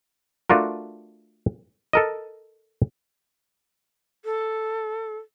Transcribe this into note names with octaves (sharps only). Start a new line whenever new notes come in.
A3 D4 F4 F#4 A#4
A4 A#4 D#5
A4